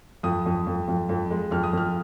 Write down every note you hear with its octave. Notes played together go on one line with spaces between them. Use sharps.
F2 D#6
F2
F2
F2
F2
G#3
F2 F6
D#6
F2 F6